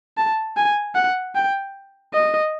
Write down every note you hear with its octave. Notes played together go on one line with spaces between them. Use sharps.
A5
G#5
F#5
G5
D#5